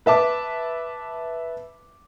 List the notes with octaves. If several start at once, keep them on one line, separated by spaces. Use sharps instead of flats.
B4 E5 A5 D6